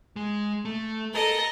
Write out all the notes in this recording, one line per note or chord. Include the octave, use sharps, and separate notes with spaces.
G#3
A3
A4 A#4 D#5